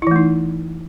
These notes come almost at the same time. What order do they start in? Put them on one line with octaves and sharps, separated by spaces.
E4 E3 A3 D#4